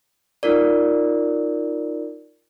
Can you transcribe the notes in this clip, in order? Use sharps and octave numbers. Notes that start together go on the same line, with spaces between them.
D#4 F4 A#4 D5